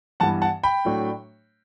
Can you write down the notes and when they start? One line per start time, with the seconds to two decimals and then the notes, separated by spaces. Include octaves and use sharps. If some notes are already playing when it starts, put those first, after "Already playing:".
0.20 G2 E3 G3 B3 F#5 A5
0.42 F#5 A5
0.63 G5 B5
0.85 A2 F#3 A3 D4